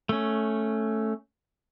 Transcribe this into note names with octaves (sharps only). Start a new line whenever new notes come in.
A3 C#4